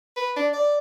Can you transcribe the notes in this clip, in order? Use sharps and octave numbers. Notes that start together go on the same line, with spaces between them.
B4
D4
D5